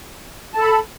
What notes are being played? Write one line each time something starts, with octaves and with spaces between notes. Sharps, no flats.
A4 A5 B5